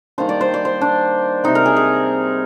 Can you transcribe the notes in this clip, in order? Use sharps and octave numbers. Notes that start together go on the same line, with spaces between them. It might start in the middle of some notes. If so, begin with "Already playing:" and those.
D#3 G3 A#3 D4 C5
D5
C5
D5
C5
D4
C3 G3 C4 D#4
A#4
G#4
G#4